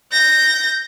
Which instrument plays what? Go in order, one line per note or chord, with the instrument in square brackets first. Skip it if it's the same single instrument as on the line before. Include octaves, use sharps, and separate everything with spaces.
[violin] G6 A#6